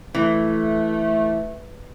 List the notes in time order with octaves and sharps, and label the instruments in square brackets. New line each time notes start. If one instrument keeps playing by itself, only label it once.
[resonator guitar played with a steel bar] E3 [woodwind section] A3